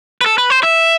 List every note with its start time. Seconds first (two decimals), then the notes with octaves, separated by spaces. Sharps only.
0.21 B4
0.26 A4
0.38 B4
0.50 C5
0.63 E5